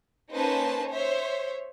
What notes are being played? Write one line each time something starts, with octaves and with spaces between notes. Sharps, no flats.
A#3 C#4 D#4 B4 C5 A5
C5 C#5 E5